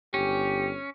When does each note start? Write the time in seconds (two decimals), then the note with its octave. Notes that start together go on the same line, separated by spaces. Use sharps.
0.14 G1 C#4 G4